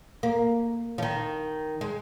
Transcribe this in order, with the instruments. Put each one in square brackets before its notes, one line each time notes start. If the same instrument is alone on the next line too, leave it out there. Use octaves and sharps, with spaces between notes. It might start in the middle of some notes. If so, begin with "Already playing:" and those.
[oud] A#3
F3
D#3
G#3